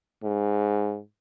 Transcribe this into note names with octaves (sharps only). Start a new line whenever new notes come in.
G#2